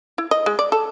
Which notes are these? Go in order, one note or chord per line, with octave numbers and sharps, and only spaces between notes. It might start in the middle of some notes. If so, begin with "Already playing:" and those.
E4
D#5
G#3
D5
A4